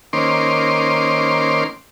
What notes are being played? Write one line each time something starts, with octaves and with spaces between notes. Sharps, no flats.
D#3 A#3 C#4 C5 C6 D6